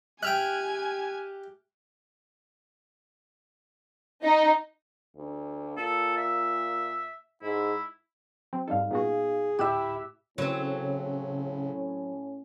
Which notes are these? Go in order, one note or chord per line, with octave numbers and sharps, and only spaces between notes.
G4 E5 G5 G#5 F6 F#6 G#6
D#4
D2
A#2 A4
E5
G#2 E4
F#3 C4
G#2 G3 D#4 A4 F5
A#2 B3 F#4 G#4
D2 A2 E4 G4 E5 F#6
A2 C#3 F#3 C4 C#4